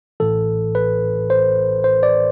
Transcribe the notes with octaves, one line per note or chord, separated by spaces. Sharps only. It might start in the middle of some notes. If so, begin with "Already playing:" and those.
A1 A2 E3 A4
B4
C5
C5
D5